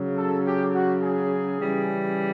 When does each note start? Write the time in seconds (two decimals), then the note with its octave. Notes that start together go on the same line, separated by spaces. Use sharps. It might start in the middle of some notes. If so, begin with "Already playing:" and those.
Already playing: C#3 F#3
0.16 A4
0.45 G4
0.73 F#4
1.02 G#4
1.59 C#3 E3 G3